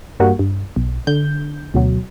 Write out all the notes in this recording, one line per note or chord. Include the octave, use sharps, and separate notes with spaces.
G2 G3 A#3 F#4
G2
B1
D3 G6
D2 B2 F#3